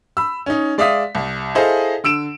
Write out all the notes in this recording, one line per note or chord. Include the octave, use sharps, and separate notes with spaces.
B5 E6
C#4 D#4
G#3 D5 E5 F5 D#6 B6
C2
E4 G#4 A4 C5 D#5 F5
D3 E6 D7 E7